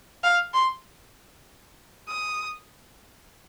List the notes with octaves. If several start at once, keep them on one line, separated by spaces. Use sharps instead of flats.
F5
C6
D#6